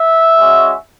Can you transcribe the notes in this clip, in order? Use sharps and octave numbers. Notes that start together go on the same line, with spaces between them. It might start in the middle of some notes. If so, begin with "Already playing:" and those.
Already playing: E5
G#3 C#4 F#4